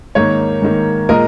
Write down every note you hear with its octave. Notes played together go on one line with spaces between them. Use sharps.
G#2 D#3 A#3 C#5
G#2 D#3 A#3
A#2 G#3 A#4 D#5